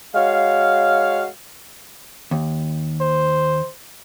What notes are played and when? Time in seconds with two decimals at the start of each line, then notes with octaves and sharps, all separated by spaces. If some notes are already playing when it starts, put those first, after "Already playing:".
0.15 G#3 F#4 C#5 F5
2.31 D#2
3.01 C5